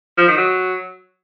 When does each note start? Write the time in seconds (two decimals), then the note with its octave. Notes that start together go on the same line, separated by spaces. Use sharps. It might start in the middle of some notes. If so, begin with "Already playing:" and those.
0.18 F3
0.28 D#3
0.37 F#3